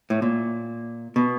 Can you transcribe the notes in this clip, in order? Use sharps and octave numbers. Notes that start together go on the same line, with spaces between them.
A2
A#2
B2